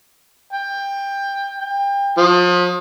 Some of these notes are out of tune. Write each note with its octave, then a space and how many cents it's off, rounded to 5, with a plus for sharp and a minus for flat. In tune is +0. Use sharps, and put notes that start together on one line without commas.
G5 +20
G5 +30
F3 +35